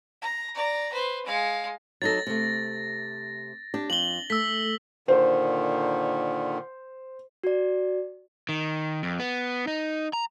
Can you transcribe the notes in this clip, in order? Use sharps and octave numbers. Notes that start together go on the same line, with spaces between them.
A#5
D5 A#5
B4 C5
G#3 F5
F#3 D#4 A4 A6 A#6
C3 A3
D4 G4
F2 F#7 G7
A3 E6 B6
A#2 D3 D#3 C5
F#4 D5
D#3
F2
B3
D#4
A#5